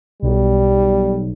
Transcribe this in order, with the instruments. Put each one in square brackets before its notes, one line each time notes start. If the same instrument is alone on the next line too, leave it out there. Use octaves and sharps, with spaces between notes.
[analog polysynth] B1 [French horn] G3